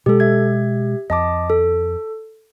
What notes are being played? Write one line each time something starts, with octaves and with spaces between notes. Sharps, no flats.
B2 G#3 G4 A4
G4 E5 G#6
F2 D#5 A5 D6
A4